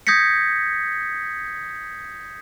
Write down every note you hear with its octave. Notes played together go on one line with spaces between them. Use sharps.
D#6 G6 G#6 A#6 B6 C#7